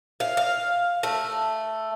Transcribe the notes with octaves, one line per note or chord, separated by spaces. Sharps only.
F5
F5
A3